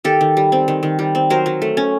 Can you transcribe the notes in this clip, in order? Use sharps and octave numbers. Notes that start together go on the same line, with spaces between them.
D#3 G4 A4
D#3
G3
C4
D#3
D#3
G3
C4
F#3 A#4 C5
F#3
A3
C#4